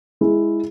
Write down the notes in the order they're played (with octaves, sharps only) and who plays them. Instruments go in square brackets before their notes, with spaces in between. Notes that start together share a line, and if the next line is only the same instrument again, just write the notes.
[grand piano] G#3 E4 G#4